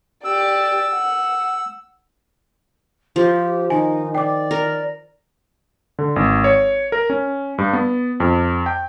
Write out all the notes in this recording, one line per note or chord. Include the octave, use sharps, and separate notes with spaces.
G4 D5 E6
F#5
F3 G4
D#3 D#4 G#5
D5 G5 D6
A#4
D3
G#1
C#5
A#4
C#4
G2
B3
F2
G5